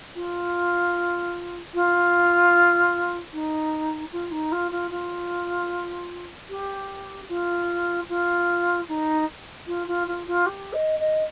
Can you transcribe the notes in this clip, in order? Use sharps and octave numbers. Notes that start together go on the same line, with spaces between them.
F4
F4
D#4
F4
D#4
F4
F4
F4
G4
F4
F4
D#4
F4
F4
F4
F4
G4
D#5
D#5